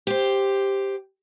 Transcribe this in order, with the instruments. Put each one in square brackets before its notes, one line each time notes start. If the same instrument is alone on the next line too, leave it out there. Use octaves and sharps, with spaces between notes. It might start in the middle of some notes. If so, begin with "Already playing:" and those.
[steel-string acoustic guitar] G4 C5